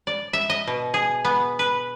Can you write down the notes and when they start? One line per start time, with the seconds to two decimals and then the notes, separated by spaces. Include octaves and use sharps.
0.07 D5
0.33 E5
0.50 D#5
0.67 B2
0.94 G#4
1.25 B3
1.59 B4